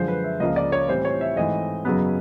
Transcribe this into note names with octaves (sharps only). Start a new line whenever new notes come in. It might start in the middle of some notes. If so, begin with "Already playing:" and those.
Already playing: F#2 D3 F3 G#3 C5
B4
E5
C#2 C#3 F3 A#3 D#5
D5
C#5
A2 E3 G3 C4 C5
C#5
E5
G#2 E3 A3 C4 D#5
F#2 C#3 F#3 B3